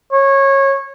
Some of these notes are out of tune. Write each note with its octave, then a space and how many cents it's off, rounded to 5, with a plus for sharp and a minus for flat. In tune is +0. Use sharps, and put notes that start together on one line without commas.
C#5 -20